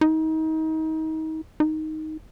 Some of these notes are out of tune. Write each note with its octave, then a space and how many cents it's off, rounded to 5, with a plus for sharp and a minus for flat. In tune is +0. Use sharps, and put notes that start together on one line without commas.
D#4 +30
D#4 +5